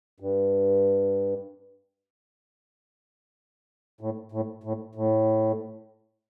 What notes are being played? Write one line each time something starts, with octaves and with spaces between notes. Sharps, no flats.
G2
A2
A2
A2
A2